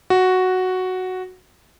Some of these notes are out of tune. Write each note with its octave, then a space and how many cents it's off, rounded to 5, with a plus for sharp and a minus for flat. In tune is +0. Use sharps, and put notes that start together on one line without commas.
F#4 +0